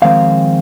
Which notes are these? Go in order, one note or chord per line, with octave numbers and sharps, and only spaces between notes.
F2 D#3 G#3 C4 F5